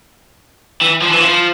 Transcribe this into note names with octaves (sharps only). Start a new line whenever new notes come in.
E3
F3
E3
F3